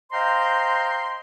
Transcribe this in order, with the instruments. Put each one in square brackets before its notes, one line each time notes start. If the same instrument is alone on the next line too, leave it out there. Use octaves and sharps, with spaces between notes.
[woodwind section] C5 D#5 F5 G5 A#5 C6